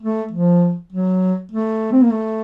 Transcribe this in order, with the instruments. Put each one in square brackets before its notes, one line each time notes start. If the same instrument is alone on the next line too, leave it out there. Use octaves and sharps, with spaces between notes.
[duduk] A3
F3
F#3
A3
C4
A#3
A3